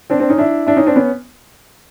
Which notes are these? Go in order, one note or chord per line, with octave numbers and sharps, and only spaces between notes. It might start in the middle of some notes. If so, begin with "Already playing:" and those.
C4 D4
C4 D4
C#4 D#4
D4 E4
D4 E4
C#4 D#4
C4 D4
B3 C#4